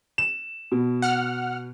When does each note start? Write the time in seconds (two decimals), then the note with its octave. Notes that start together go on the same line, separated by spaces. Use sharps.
0.18 E7
0.72 B2
1.02 F#5 F6